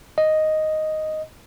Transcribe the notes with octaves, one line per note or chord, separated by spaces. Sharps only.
D#5